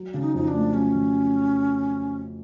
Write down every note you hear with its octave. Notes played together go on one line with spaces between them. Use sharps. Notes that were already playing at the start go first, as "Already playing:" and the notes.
Already playing: F#3
C#3 D4
D#4
F2 D#4
D4
A3
F#3 C#4
C#3